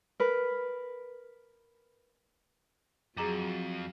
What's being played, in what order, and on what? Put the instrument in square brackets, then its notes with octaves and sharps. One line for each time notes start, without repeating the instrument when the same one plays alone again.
[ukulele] A#4 B4
[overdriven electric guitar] F2 [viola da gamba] F#3 [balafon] G#4 A#5 D6